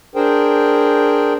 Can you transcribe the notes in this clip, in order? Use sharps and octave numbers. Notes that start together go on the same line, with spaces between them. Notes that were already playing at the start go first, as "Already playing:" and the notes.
D4 G#4 A#4 C5 G5